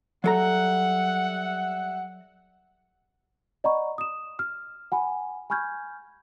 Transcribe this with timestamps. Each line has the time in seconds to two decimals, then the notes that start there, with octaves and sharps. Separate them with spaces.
0.24 F#3 G3 A4 E5 F#5 A#5
3.64 D5 D#5 F#5 A#5 B5 C#6
3.98 D#6 E7
4.39 F6
4.92 F#5 G#5 B5
5.50 G#5 B5 C#6 F6 G6 G#6